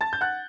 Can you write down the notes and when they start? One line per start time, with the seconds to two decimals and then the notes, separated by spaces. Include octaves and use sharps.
0.01 A5 A6
0.13 G6
0.21 F#5 F#6